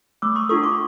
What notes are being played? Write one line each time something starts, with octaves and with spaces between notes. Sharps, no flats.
A3 D6 E6
C#6 D#6
D4 F4 A4 C#6 D#6
C6 D6